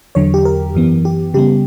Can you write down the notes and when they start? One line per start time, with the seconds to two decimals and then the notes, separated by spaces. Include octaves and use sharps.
0.15 E2 D3 F#3 C#5
0.34 G4
0.45 A#4
0.75 F#2 E3 B3
1.05 G4
1.34 C#3 G3 B3 G4